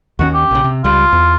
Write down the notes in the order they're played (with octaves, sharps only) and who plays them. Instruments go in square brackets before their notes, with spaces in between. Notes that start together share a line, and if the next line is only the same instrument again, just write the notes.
[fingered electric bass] D#2 D#3 C#4 [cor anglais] F#4
[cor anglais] G4
[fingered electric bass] A#1 C#3
C3
[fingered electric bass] C#2 G3 [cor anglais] F4
[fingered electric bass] E2